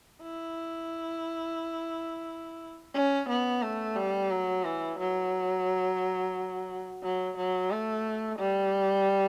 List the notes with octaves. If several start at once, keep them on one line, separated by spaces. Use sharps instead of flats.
E4
C#4
B3
A3
G3
F#3
E3
F#3
F#3
F#3
A3
G3